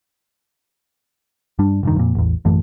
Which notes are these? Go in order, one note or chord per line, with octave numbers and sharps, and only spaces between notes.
G2 G3 D4
F1 G2 D#3
F2 A#2
A1 E2
A1 F#2 E3 A3